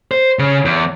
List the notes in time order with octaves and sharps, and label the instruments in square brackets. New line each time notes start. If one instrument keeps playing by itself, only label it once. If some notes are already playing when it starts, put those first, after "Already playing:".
[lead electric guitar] C5
C#3
E2